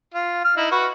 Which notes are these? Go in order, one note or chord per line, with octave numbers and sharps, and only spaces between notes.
F4
F6
D#4 E4
F#4 B4